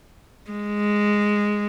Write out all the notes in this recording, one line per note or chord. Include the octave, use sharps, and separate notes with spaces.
G#3